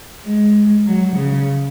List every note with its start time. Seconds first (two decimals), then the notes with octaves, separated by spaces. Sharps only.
0.24 G#3
0.86 F#3
1.16 C#3